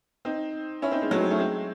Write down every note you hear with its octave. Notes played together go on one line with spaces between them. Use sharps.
C4 D#4
C#4 E4
C4 D#4
G#3 C4
F#3 A3
G#3 C4
A3 C#4
G#3 C4